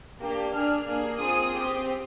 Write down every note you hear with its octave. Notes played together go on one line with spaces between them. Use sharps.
A#3 D4 G4
D4 G#4 F6
A#3 D4 G#4
C4 F4 G#4 D#6
C4 G4